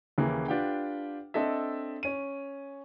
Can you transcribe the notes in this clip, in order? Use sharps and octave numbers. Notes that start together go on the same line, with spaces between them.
D#2 C#3 E3 A#3
D4 F4 G4 B4 F#5 G5
C4 D4 A4 D#5 E5
C#4 D#7